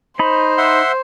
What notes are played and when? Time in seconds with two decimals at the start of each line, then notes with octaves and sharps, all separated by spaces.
0.19 D#4 C5 B5
0.58 E5 F#5 C6